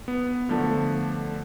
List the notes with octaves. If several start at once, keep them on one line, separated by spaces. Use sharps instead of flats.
B3
D3 F3 A3